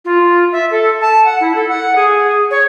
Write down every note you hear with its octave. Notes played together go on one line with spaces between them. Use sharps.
F4
E5
A4
A5
F#5
E4
A4
F#5
G#4
C#5